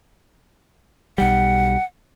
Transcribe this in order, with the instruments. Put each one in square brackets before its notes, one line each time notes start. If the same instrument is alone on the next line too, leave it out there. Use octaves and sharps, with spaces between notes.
[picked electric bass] B1 G3 [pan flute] F#5